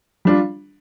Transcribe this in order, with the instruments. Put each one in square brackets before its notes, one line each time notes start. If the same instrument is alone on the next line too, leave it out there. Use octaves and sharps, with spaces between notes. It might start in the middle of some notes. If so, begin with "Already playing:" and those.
[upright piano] G3 D4 F4